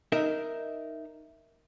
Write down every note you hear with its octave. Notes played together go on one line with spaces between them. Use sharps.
D#4 A#4 E5